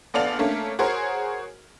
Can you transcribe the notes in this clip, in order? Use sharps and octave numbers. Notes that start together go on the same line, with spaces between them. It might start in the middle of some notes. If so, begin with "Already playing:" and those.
A#1 B3 A4 D5 F5 F7
A3 A#3 C#4 D4
F#4 G#4 A#4 C5 C#5